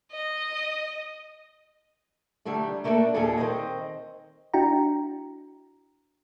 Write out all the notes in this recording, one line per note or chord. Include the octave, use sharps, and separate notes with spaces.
D#5
D3 F#3 G3 A3 D4
A3 A#3 D4 F#4 A4
D#2 A#2 G3 G#4 A4
D#3 C4 C5 D#5
D4 E4 F#4 G5 A#5